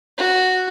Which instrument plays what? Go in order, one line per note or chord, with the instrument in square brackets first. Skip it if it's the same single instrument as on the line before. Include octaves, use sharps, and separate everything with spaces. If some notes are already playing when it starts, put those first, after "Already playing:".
[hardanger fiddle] F#4